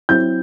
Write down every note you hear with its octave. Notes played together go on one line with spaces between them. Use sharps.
F#3 C4 E4 G6